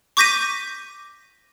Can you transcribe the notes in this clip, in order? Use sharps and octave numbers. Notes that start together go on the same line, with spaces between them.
C#6 D6 G6 A#6 B6 D#7